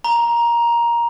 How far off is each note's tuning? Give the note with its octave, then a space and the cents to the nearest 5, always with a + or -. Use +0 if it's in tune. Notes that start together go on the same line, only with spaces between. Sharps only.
A#5 +10